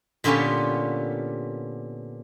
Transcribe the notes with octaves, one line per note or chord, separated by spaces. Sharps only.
A#2 D3 B3 C#4 F4 G4